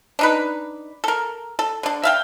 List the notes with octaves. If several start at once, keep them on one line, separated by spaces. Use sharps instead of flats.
D4 D#4 B4
A4 A#4
A4
D3 D4
E5 F5 G5